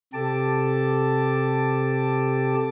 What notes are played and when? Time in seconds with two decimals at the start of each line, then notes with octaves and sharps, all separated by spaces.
0.13 C3 G4 A4 A5 D6